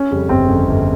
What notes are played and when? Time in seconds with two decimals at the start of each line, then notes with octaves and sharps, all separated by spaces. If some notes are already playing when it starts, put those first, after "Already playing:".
Already playing: C#4
0.11 F2 C#3 G3
0.29 G1 C4
0.48 F2 C#3 G3
0.68 G1